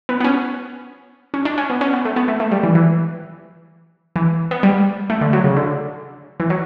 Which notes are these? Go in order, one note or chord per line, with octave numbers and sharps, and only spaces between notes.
B3
B3
C#4
C#4
D4
C#4
B3
C#4
B3
A3
B3
A3
A3
G3
E3
E3
E3
B3
G3
A3
D3
F#3
C#3
D3
E3
F#3